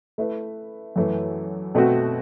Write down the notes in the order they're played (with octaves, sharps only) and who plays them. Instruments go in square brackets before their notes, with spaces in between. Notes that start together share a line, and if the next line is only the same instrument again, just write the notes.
[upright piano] A3 E4 B4
F#2 E3 A3
B2 A3 C4 F#4